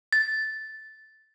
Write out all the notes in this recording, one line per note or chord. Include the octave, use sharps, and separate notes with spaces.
A6